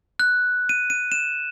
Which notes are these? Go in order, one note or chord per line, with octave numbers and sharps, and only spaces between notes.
F#6
D#7
D#7
E7